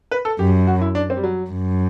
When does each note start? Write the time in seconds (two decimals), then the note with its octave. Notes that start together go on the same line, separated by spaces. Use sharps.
0.11 B4
0.25 A4
0.39 F#2 G4
0.67 F#4
0.81 E4
0.95 D4
1.10 C4
1.17 G3
1.24 F#3
1.51 F#2